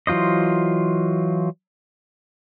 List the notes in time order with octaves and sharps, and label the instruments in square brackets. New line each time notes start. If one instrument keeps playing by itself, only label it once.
[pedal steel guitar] E3 F#3 F4 C5 D#5